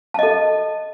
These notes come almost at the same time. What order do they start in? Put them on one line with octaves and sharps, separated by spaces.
A5 D#5 A4